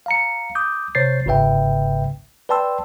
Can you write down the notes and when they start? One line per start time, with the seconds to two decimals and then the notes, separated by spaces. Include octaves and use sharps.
0.06 F5 A#5 C#7
0.55 D6 D#6 G6
0.95 C3 C5 C#5 G6 A6 C7
1.26 G1 G#2 C#3 B4 E5 G5
2.49 B4 D5 G5 A5 C6 E6